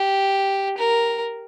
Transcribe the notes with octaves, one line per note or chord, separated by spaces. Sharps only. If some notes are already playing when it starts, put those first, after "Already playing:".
Already playing: G4
A#4